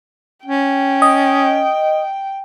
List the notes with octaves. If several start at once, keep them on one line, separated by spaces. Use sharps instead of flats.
C#4 G5
D#5